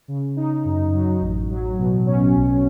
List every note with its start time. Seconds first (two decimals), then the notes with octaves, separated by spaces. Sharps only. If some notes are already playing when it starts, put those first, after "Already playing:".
0.08 C#3
0.37 D#4
0.65 F#2
0.93 F#3
1.21 A1
1.50 F#3
1.78 B2
2.06 C#4
2.34 B1